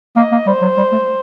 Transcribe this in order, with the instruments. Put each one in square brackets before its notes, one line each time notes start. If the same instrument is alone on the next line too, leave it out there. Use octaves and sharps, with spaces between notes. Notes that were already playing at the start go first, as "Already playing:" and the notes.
[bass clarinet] A#3 [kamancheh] D#5
[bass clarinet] A#3
[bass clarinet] G3 [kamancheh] C5
[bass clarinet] F#3
G3
A3